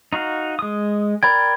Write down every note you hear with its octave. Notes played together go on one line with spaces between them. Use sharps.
D#4 F#4 F5
G#3 D#6
A#4 D5 G5 B5 G#6